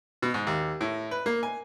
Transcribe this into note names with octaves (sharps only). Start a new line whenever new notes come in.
B2
G#2
D#2
A2
B4
A#3
G#5